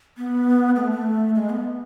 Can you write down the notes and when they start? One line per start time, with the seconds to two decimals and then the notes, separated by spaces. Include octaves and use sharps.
0.18 B3
0.76 A3
0.91 A3
1.35 G#3
1.50 B3